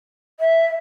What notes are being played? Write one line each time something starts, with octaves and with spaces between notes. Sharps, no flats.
E5